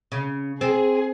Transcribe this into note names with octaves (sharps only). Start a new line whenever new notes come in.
C#3
C4 G#4